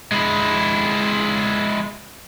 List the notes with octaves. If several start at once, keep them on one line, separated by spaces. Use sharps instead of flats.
G#3 E4